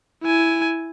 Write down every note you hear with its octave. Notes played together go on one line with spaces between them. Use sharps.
E4 G#5